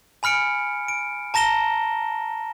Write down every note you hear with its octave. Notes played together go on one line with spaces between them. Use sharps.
G#5 B5 F6 C#7 D7
D7
A5 A#5 A#6 E7 G7